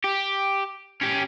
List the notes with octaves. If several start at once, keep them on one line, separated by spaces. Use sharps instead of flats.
G4
C#4 G4